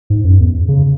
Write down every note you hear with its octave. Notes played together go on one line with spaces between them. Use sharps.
G#2
F#2
E2
C#3